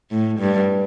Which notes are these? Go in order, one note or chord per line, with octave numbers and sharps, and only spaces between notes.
A2
G2